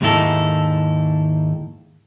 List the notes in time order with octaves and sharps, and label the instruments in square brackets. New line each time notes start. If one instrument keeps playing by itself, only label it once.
[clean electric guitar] D#2 G#2 D#3 D#4 E4 A4